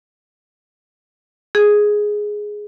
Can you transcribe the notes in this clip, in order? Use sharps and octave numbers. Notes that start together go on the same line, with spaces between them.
G#4